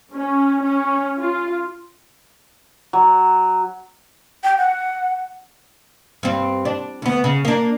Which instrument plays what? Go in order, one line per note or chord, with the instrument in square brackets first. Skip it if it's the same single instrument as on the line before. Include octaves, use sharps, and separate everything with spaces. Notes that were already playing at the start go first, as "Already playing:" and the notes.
[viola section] C#4
C#4
F4
[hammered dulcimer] F#3
[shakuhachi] G5
F#5
[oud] G2 C4
D4
D2 B3
C#3
A#3 D4